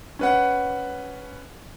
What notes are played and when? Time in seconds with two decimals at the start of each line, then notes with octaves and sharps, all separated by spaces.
0.19 C#4 B4 F#5